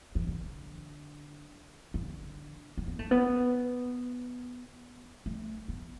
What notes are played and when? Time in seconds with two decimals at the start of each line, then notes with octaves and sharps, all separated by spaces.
0.15 E3
0.27 D3
1.94 D3
2.78 C4
2.88 B3
2.99 A3
3.11 B3
5.26 A3
5.68 B3